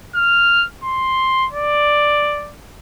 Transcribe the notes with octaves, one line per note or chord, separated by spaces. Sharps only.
F6
C6
D5